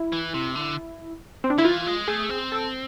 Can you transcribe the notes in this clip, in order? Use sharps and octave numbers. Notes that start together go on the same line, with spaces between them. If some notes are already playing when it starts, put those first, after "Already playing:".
Already playing: E4
E3
C3
D3
C4
D4
D3 E4
E3 F4
G#3
A3 G#4
C4
A4